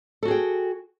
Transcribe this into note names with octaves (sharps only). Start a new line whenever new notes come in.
F#4 G#4 A4 G5